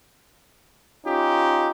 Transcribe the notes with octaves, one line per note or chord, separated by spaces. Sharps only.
C#4 D#4 F4 G4